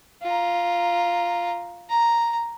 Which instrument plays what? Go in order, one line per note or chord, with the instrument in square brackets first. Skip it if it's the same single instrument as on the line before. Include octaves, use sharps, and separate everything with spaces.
[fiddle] F4 A#5
A#5